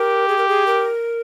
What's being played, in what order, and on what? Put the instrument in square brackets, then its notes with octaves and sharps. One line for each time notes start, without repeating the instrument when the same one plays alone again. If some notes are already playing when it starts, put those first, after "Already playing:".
Already playing: [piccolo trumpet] G4 [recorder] A#4
[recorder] G#4
A#4
G#4
A#4